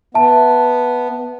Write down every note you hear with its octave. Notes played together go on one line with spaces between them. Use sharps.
B3 E5 A5